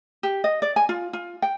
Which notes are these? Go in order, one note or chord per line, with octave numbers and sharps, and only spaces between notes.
G4
D#5
D5
G#5
F4
F4
G5